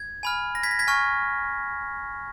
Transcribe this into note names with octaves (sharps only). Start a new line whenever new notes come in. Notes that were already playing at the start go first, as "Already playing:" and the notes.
Already playing: G#6
G#5 B5 F6
A#6
G#6 B6
A#6
G#6 B6
G#5 C#6 F6